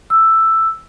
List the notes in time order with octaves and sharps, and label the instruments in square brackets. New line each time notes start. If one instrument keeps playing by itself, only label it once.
[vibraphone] E6